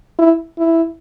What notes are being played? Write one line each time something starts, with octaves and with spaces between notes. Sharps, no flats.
E4
E4